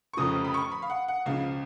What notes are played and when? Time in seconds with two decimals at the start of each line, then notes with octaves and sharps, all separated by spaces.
0.13 C#6
0.17 F1 F2 C#3 F3 D#6
0.45 B5
0.54 C#6
0.72 B5
0.82 F5
0.90 F#5
1.08 F#5
1.26 C#2 C#3 F3 F5